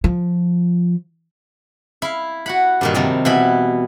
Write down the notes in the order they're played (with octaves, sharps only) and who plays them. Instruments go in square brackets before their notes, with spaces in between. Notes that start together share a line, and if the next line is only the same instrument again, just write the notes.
[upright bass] F3
[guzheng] E4 F5
F#4 F#5 B5
G2 A#2 D#3
C3 D#3 F3 G3
B2 E3 E4 B5